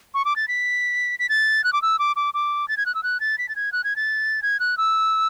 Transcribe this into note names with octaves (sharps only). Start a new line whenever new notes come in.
C#6
D6
A6
B6
B6
A6
F#6
D6
E6
D6
D6
D6
A6
G#6
F#6
E6
F#6
A6
B6
A6
G#6
F#6
G#6
A6
G#6
F#6
E6